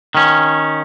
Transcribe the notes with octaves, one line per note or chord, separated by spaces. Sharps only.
D#3 C#4